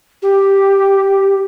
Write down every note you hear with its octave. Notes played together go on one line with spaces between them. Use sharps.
G4